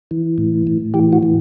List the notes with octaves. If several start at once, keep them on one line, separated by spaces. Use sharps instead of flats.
E3
A2
A2
E3 G4
F#4
E3